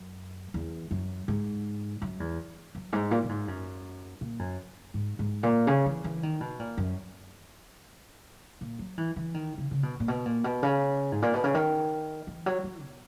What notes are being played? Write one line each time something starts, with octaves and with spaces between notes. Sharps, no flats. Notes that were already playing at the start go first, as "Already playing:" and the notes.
Already playing: F#2
E2
F#2
G#2
F#2
E2
F#2
G#2
A#2
A#2
G#2
F#2
A#2
F#2
G#2
G#2
A#2
C#3
E3
E3
D#3
B2
A#2
F#2
A#2
F#3
E3
E3
D#3
C#3
C#3
B2
A#2
B2
A#2
B2
C#3
G#2
A#2
B2
C#3
D#3
E3
F#3
F#3
B2